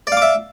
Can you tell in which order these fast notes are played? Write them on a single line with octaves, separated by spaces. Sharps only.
D5 F5 D6 E5